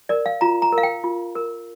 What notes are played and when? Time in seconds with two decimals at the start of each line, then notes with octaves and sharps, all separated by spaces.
0.09 A#4 D5
0.26 F5
0.41 F4 A#5
0.62 A#5
0.72 A#4
0.78 F5
0.83 G5
1.04 F4
1.36 A#4